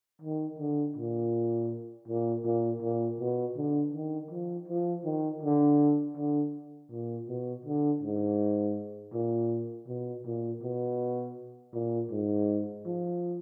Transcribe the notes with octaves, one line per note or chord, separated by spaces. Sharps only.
D#3
D3
A#2
A#2
A#2
A#2
B2
D3
D#3
F3
F3
D#3
D3
D3
A#2
B2
D3
G#2
A#2
B2
A#2
B2
A#2
G#2
F3